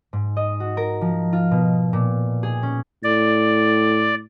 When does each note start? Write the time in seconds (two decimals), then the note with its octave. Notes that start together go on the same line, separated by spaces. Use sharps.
0.13 G#2
0.37 D#5
0.60 F#4
0.77 A#4
1.01 F3
1.33 F4
1.51 B2
1.93 A#2
2.43 G#4
2.63 C#4
3.04 A2 D5